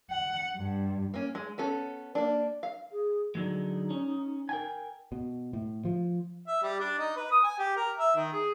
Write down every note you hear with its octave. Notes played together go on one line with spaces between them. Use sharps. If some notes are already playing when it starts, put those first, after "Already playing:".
F#5
G2
A#3 C#4
G#3
B3 C#4 A4
A#3 D4
F5
G#4
D3 F#3 G#3 D#4
C#4
A#4 G5 G#5
B2
A2
F3
E5
G3
D4
D#4
B4
D#6
G#5
G4
A#4
E5
D#3
G#4